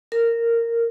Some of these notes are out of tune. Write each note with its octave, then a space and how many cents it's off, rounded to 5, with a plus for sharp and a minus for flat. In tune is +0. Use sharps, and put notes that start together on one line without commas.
A#4 -10